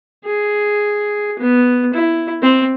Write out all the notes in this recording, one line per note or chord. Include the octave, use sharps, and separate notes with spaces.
G#4
B3
E4
C4